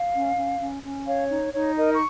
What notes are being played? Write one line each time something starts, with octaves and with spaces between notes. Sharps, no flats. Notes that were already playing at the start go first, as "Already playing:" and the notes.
Already playing: F5
C#4
C#4
C#4
C#4
C#5 F5
D#4
D#4 C#5
A#4 D#5
C#6